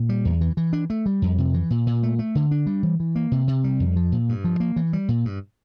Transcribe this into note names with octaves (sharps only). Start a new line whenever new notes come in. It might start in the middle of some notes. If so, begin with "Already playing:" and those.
Already playing: A#2
G3
E2
E3
E3
D4
A3
G3
F2
C3
E3
A#2
A#2
A3
A3
D3
D4
G3
E3
E3
A#3
C3
C3
G3
F2
F3
A#2
G2
F3
A#3
E3
G3
A#2
G2